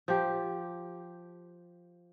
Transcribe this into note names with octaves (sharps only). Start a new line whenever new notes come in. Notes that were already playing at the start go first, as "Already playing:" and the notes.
F3 G4